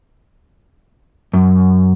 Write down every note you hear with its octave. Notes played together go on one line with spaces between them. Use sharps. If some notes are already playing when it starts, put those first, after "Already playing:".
F#2